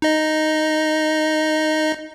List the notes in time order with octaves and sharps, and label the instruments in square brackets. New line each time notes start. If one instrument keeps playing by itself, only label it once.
[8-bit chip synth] D#4 D#5